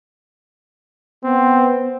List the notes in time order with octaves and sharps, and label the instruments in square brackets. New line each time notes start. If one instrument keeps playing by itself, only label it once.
[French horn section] B3 [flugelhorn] C4